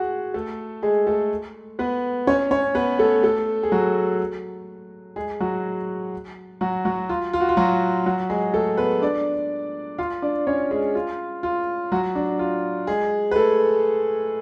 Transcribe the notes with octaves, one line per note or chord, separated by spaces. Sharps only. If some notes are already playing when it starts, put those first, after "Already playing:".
Already playing: F#4 G#4 F#5
A3 A4
G#3 G#4
A3 A4
B3 B4
C#4 C#5
C#4 C#5
B3 B4
A3 A4
A3 A4
G#4
F#3 F#4
G#3 G#4
F#3 F#4
F#3 F#4
F#3 F#4
F4
F4
F#4
F4
F#3 F#4
F#3 F#4
G#3 G#4
A3 A4
B3 B4
D4 D5
F4 F5
D4 D5
C#4 C#5
G#3 G#4
F4
F4
F#3 F#4
D4
F4
G#3 G#4
B4
A3 A4